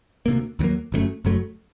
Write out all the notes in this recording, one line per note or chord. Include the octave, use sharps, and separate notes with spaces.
D2 C3 F#3 A#3
D#2 D3 F#3 A#3
G1 F#2 D3 A3
F#1 F#2 F#3 A3